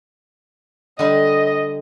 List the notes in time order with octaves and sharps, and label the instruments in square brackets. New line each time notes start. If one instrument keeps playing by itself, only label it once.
[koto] D3 G3 [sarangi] D#5